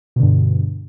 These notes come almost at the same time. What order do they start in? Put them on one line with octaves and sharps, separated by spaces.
B2 D3 G2